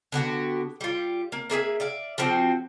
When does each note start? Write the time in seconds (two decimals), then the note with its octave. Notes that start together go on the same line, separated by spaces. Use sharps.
0.12 D3 B3 F#4 G4
0.81 G3 F4
1.32 A#3
1.50 A#3 G#4 E5 G#5
1.80 D5 E5 F5
2.18 F3 G3 C4 F#4